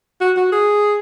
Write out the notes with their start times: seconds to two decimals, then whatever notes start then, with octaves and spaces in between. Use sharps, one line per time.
0.21 F#4
0.37 F#4
0.52 G#4